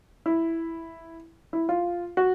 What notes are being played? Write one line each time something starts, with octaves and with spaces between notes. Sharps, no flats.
E4
E4
F4
F#4